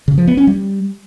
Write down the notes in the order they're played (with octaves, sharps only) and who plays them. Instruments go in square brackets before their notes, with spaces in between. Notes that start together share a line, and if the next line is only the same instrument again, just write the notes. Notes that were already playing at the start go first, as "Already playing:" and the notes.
[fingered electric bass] C#3
F3
B3
C#4
G3